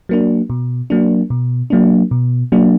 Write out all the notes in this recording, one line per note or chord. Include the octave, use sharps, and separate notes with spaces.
F#3 A#3 D4
B2
F#3 A#3 D4
B2
F#3 A#3 D4
B2
F#3 A#3 D4